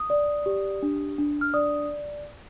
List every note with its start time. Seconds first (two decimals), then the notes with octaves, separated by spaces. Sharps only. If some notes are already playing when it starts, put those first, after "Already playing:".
Already playing: D#6
0.10 D5
0.46 G4
0.83 D4
1.18 D4
1.41 F6
1.54 D5 D#6